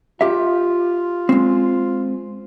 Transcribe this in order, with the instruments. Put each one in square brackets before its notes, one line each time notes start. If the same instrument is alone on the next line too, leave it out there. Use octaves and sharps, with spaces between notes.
[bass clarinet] F4 [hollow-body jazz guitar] G4 E5
[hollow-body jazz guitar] G#3 C4